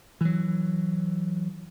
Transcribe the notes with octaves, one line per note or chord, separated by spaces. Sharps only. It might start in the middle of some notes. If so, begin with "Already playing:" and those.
E3 F#3